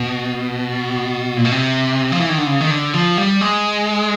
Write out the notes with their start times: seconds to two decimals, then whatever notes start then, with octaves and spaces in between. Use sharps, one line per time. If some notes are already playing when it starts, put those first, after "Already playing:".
Already playing: B2
1.37 A#2
1.45 B2
1.52 C3
2.12 F3
2.20 E3
2.29 D#3
2.38 D3
2.47 C#3
2.61 D#3
2.71 D3
2.94 F3
3.17 G3
3.41 G#3